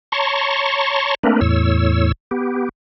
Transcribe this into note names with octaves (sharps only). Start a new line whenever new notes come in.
C#5 A5 A#5 C6 C#6
A3 A#3 C4 D4 A#4 B4
E2 A2 C#5 E6
B3 G4